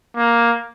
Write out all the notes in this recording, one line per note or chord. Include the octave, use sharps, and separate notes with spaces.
A#3